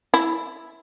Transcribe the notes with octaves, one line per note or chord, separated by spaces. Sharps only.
E4